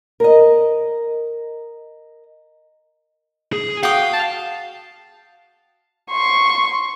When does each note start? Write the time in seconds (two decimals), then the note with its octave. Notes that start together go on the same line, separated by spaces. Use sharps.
0.20 A#4 D#5
3.53 G#4
3.83 F#4 F5 G5 D#6
4.13 A5
6.11 C6 C#6